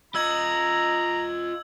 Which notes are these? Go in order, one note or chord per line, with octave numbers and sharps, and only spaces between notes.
F4 D#5 A#5 E6 G#6 F#7